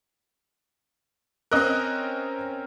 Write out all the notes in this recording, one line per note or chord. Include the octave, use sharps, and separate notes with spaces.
C4 C#4 A#4 D#5 F#6